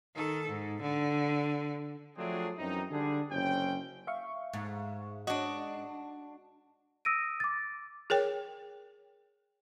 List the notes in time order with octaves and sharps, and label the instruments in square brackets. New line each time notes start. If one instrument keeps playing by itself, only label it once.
[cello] D#3 A4
G#2
D3
[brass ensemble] F3 F#3 A3 C4 D4 G#4
F#2 E3 C4 D#4
D3 G3 D4 G#4
F#1 C4 C#4 G5
[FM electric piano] E5 F5 C#6
[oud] G#2
[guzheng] D4 F#4 [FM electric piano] D#5
[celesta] D#6 E6 A#6 D7 D#7
D6 A6
[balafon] G#4 A#4 C#5 G5